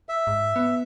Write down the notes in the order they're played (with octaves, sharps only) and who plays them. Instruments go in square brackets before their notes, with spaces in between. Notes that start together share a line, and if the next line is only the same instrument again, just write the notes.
[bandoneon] E5
[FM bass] G#2
B3